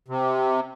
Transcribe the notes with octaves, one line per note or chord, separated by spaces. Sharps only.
C3